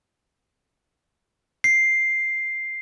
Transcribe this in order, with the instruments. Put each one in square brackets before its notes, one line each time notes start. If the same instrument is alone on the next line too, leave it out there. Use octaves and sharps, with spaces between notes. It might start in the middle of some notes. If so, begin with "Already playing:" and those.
[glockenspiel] C7